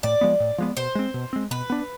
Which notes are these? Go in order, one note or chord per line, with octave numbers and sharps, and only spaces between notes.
A2 D5
F3 G#3 B3
A2
F3 G#3 B3
B2 C5
G#3 C4
B2
G#3 C4
B2 B4
B3 D4